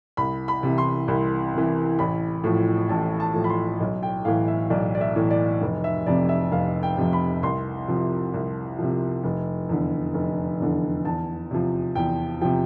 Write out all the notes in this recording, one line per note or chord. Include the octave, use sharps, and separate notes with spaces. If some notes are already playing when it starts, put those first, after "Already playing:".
C2 B5
B5
C3 E3
C6
C2 B5
C3 E3
A1 B5
A2 F3
A1 A5
A5
A2 F3
B5
C6
B1
G5
A2 E3 F5
E5
B1 D5
D5
E5
A2 E3
D5
F1
E5
F2 C3 D5
E5
F1 F5
G5
F2 C3
B5
C2 C6
C3 F3
C2
C3 F3
F1
E2 D3
F1
E2 D3
E2 A5
C3 F3
E2 G5
C3 F3 G5